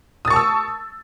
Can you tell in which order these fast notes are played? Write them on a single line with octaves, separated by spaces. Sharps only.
D#6 A6 C#6 A5 E6